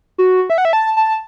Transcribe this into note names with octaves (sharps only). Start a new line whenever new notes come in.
F#4
E5
F#5
E5
A5
A5